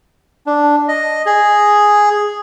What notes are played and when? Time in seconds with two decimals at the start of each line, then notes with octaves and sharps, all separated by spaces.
0.46 D4
0.88 D#5
1.26 G#4